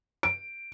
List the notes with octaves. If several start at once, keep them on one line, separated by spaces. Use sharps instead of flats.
D7